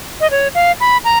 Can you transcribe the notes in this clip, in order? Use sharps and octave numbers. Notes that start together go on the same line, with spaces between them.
D#5
C#5
F5
B5
A#5